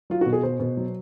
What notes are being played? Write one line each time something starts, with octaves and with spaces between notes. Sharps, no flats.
F#3 F4
F#4
B2
G#4
B2 C5
B2
F#3